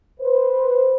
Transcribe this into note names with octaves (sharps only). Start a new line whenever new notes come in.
B4 C5